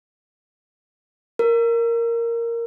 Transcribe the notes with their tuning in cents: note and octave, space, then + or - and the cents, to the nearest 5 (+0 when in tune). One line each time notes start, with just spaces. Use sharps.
A#4 -5